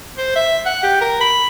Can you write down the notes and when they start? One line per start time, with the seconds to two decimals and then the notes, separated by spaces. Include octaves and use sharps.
0.18 C5
0.36 E5
0.66 F#5
0.83 G4
1.01 A#4
1.21 B5